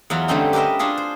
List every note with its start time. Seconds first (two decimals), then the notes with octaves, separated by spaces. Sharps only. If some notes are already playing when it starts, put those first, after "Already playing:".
0.10 E2 E3 F#3 F4 A#5
0.28 D3 G3 A3 C4 C#4 D#4
0.53 G4 A#4 B4 D#5 E5
0.79 D4 F4 G#4 A4
0.98 C5